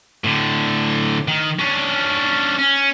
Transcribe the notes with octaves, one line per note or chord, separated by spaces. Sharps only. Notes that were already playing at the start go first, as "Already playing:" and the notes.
A2 D3
D#3
C#4 D4
C#4